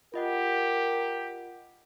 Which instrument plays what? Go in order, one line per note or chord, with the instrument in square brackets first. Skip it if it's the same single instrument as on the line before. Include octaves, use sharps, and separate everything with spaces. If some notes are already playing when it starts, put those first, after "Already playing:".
[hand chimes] F4 D#5 F#5 [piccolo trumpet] G4 [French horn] A#4